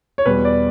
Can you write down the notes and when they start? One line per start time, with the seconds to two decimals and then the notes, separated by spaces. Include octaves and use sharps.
0.18 C#5
0.26 E2 B2 G3 B4
0.45 D5